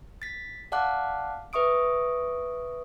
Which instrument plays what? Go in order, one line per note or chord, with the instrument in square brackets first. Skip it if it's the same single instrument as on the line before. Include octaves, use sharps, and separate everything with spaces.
[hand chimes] A6 B6
D5 F5 F#5 A5 D6 F#6
B4 E5 C#6 D#6 D7